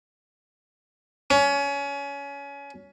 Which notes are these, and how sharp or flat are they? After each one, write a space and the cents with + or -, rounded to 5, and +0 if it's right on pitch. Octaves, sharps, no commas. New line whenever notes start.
C#4 +25